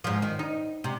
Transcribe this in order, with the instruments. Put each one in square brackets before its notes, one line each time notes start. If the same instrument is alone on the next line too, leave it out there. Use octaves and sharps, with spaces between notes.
[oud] G#2 F3
D#3
D#4
C3